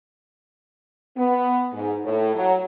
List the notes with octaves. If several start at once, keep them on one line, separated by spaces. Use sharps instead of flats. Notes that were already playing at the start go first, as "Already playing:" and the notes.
B3
G#2
A2
F#3